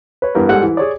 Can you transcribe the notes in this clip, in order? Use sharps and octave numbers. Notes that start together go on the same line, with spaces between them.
B4 C#5
G2 E3 B3 A#4
G#2 G3 A4 F#5
E3
G#4 C#5 D5